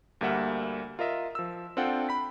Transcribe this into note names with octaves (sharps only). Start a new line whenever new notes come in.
D2 G3 A#3 E5 F#5 F6
F4 A#4 D#5 E5
F3 E6
C4 D4 F4 A4 F#5 G5
B5 B6